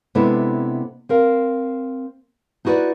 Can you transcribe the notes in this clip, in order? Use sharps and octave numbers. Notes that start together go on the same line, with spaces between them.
C3 G#3 B3 D4 E4 A4
C4 A#4 F5
D#4 E4 F#4 G#4 B4 D5